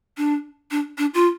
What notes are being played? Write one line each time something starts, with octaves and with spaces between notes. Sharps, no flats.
D4
D4
D4
F4